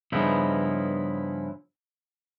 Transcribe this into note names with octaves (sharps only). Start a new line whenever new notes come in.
G2 C#3 F3 B3 D#4 E4